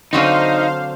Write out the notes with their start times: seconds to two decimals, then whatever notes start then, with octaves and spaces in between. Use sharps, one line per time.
0.13 D3 F#3 C4 D#4 C5 F5